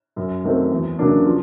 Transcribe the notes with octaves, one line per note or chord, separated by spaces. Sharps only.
F#2
D#3 F#3 A3 C4
E2
C#3 F#3 A#3 D4
F3